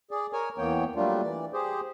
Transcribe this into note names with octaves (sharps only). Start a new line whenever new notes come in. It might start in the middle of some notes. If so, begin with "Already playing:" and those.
G#4 D5
A#4 C#5 G#5
E2 E3 A#3 B3 C#5 G5
F#3 G3 A3 A#3 D4 F4
E3 D5
G4 G#4 C5